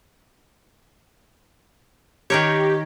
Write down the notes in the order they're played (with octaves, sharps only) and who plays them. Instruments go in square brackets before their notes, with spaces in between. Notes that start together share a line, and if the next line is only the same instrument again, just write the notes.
[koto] D#3 A#4 C#5 [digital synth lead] G4